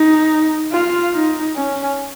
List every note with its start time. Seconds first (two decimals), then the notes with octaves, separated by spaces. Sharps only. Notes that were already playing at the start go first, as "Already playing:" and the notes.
Already playing: D#4
0.72 F4
1.14 D#4
1.56 C#4